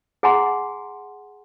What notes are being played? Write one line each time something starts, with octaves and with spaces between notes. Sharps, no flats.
G#4 F#5 G#5 A#5 C6